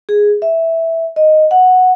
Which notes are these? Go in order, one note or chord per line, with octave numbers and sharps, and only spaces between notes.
G#4
E5
D#5
F#5